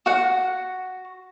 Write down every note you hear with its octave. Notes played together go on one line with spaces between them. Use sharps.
F#4 F#5